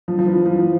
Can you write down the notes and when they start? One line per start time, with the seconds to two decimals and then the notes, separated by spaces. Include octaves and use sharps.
0.08 F3
0.19 F3
0.27 E3
0.46 F3